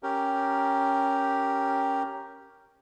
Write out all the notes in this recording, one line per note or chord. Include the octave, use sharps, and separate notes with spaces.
C#4 G4 A#4